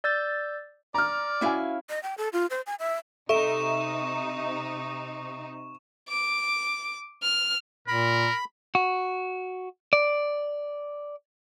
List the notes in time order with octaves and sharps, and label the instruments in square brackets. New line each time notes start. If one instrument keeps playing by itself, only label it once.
[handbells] D5 E6 G6 A6
[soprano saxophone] D5 [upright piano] A#5 F6
[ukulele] C#4 E4 F5 [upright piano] F#4 G#5
[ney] D#5
G5
A4
F4
C5
G#5
E5
[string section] C3 D#4 [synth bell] A4 [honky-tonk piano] E5 [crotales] C#6 E7
[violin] D6
F6
[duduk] A#2 [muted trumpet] A#4 [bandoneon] B5
[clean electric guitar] F#4
D5